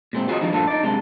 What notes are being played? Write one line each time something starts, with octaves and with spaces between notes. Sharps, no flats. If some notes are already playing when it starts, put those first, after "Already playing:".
A#2 G#3 C4
F4 F#4 G#4 A4 C#5 D#5
F3 G3 D4 D#4
G2 A#2 F3 D4 A4
D#4 D5
F#2 C3 G#3 D4